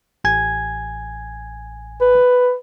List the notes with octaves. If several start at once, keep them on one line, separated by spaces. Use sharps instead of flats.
A1 G#5 G#6
B4